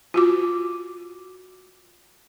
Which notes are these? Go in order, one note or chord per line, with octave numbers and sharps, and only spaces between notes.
F4 F#4 D6